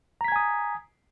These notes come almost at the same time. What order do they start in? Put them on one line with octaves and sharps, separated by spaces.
A#5 B6 G#6 G#5 D#6